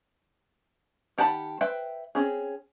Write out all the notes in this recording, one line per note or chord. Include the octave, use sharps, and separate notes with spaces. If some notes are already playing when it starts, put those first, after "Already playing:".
D#3 G4 F#5 A5 B5
B4 C5 E5 G5
C4 C#4 G#4